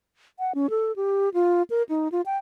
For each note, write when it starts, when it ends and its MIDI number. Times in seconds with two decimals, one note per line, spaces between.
0.39 0.55 78
0.55 0.70 61
0.70 0.95 69
0.96 1.29 67
1.34 1.63 65
1.70 1.83 70
1.89 2.08 63
2.12 2.21 65
2.26 2.37 79